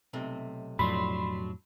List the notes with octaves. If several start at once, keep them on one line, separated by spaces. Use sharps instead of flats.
B1 C3 A3
F2 A2 F#3 D4 B5 C6